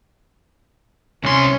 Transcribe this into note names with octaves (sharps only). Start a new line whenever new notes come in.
C2 C#4 C6